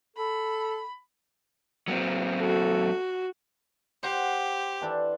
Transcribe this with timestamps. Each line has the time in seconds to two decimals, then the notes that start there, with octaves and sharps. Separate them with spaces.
0.17 A4 B5
1.88 F#3 A#3 C4
2.40 F#4 A4
4.03 G4 C5 F#5
4.81 E3 D4 A4